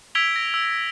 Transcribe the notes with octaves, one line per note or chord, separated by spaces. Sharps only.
E6 G#6 B6 D7 F7 G7
A#6
E6